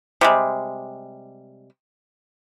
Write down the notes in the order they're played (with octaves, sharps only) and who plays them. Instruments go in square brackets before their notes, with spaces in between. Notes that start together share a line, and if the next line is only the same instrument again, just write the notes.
[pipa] C3 G3 G#3